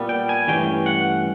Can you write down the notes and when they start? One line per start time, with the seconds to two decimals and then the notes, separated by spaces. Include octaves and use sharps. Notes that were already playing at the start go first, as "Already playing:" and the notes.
Already playing: A#2 G3 B3
0.09 G5
0.29 G#5
0.47 G2 E3 A3 C#4 G5
0.86 F#5